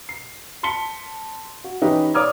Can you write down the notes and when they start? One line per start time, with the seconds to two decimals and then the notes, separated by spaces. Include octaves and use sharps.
0.09 C7
0.63 A5 C6 B6 C#7 G7
1.64 F#4
1.82 E3 C#4 D#4 E4 G4 B4
2.14 C#5 D5 D6 D#6 F6 G#6